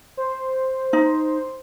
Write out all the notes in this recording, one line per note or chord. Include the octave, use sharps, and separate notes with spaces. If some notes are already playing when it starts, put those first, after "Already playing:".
C5
D#4